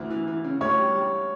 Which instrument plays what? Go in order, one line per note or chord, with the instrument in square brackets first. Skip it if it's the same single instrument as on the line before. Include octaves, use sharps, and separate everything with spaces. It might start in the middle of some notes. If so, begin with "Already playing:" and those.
Already playing: [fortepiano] D2 E3
E3
E3
C#3
[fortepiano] D2 [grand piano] C#5
[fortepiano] G3
G3